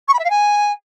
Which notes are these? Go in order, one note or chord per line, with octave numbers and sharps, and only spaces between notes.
C#6
B5
E5
F5
G#5